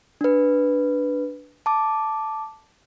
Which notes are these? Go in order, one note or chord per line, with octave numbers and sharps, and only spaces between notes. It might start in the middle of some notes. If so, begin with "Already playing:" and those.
D4 B4
A5 D6